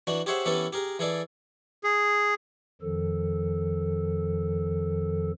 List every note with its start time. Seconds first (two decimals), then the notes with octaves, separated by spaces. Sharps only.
0.07 E3 D4 F#4
0.26 G4 G#4 C5 C#5 E5 F#5
0.46 E3 B3 C#4 G4 A4
0.73 G4 G#4 A#4
0.99 E3 G#4 A4 D5
1.84 G#4
2.82 F2 D#3 F3 A4